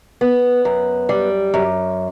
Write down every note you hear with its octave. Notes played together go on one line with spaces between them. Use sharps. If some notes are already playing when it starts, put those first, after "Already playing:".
B3
F#2
G3
F#2